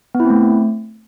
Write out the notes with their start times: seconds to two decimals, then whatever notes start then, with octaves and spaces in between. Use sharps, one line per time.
0.15 B3
0.20 E4
0.25 C4
0.30 A3